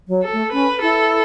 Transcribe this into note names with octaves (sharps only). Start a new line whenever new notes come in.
F#3
A4
A3
C#4 B4
E4 A4